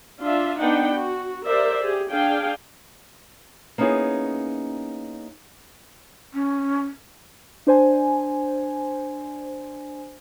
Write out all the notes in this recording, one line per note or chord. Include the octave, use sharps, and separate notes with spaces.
D4 F4 E5
B3 D4 D#4 B4 F#5 G5
F#4
G4 A#4 C5 D5 E5
G4 G#4
D4 G#4 F5 G5
A#3 B3 C#4 D#4 E4 G#4
C#4
D4 C5 G#5